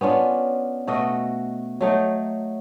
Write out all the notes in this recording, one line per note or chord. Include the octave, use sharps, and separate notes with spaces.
B3 C#4 D4 F4
B2 A3 F#4 D#5
F#3 A3 D#4